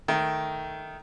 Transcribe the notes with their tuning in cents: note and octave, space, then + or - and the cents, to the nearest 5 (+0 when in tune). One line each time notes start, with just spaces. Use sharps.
D#3 +0 A3 +0